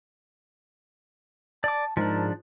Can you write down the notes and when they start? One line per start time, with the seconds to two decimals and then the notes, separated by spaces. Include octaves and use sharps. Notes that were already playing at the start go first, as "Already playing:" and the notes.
1.64 D5 A5 D6
1.97 G#2 F3 D4 A#4